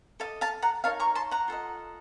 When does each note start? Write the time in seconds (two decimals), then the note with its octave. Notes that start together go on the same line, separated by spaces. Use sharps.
0.20 A4 D#5 F5
0.41 F5 A5
0.62 F#5 A#5
0.84 D#4 A#4 C#5 F5 A5
1.00 A#5 C#6
1.15 A5 C6
1.31 F#5 A#5
1.48 F4 A4 D#5